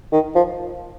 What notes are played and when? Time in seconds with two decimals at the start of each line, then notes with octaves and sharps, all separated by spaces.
0.12 D#3
0.35 F3